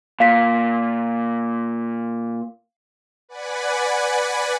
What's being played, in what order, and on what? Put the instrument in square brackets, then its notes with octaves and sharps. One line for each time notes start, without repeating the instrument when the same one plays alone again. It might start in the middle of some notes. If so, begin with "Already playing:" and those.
[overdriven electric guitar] A#2 [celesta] F5 B6
[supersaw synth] B4 D5 F#5 G#5 B5